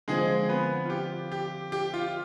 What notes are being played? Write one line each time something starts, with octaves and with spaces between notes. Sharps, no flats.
D3 F3 G#3 C4 G#4
B3 B4
F4
G4
G4
G4
F4